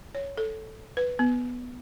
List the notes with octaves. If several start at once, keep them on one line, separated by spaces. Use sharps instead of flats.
C#5
A4
B4
B3